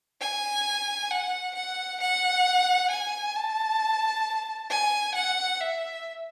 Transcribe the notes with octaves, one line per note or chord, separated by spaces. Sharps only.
G#5
F#5
F#5
F#5
G#5
A5
G#5
F#5
E5